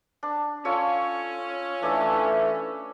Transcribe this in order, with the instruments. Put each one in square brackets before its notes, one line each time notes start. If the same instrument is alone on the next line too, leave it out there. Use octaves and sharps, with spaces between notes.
[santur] D4
[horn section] C#4 [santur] F4 A4 C#5
[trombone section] E3 A3 [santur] D4 C#5 E5